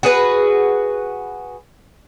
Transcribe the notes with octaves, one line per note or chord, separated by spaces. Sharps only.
F#4 G#4 B4